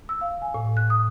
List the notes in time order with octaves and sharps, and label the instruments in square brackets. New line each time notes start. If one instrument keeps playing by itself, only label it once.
[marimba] E6
F5
G#5
A2
F#6
D#6